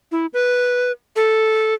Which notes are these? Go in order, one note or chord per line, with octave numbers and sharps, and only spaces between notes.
E4
B4
A4